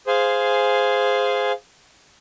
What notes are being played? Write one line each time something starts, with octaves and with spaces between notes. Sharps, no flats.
G#4 C5 F5 G#5